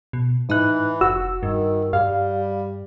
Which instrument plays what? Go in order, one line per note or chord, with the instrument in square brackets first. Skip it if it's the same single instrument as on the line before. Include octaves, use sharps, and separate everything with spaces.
[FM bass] B2
[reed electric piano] G#2 F#6 [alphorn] E3 [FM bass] D#4
[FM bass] F1 [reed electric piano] F#4 E6
[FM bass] G2 [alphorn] D#3
[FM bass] G2 [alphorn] G3 [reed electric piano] F5